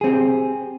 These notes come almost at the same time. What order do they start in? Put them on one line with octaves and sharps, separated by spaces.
G#4 C4 G4